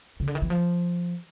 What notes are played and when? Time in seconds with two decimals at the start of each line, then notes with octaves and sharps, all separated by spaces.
0.20 C#3
0.27 D3
0.35 D#3
0.42 E3
0.50 F3